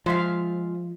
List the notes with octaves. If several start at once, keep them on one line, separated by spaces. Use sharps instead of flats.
F3 G#3 E5 F5